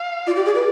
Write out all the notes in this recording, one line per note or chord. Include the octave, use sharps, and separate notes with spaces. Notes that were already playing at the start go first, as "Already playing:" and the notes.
Already playing: F5
F4 D5
G4
G#4
B4